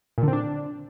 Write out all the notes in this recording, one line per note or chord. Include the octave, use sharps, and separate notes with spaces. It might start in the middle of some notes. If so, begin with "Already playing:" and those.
A#2
D3
C4
D4